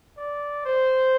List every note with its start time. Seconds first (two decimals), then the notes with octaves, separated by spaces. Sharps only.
0.18 D5
0.65 C5